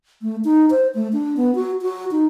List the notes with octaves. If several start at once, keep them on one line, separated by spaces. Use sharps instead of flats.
A3
D#4
C5
A3
D4
B3
F#4
F#4
D#4